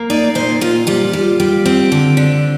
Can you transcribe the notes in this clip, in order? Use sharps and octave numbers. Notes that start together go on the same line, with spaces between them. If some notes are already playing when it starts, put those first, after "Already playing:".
Already playing: A#3
D#4 D5
A#2 C5
A#2 F4
G3 F4
G3
G3
C4
D3
D3